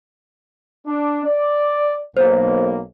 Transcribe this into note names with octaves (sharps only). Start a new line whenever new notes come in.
D4
D5
B1 A#3 C5